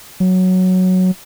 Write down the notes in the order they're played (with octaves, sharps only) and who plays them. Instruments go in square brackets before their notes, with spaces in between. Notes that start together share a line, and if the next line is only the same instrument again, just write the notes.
[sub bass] F#3